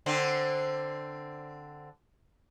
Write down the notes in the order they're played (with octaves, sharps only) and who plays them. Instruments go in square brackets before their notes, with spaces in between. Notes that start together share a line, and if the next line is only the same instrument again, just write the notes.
[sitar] D3 C4